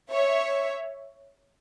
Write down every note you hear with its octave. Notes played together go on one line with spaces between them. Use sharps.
C#5 E5